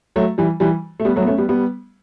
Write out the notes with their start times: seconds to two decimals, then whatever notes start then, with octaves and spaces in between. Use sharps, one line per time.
0.16 F#3 A3
0.38 E3 G3
0.60 E3 G3
1.00 A3
1.05 G3 B3
1.16 F#3 A3
1.22 B3
1.27 A3 C#4
1.38 G3 B3
1.49 G3 B3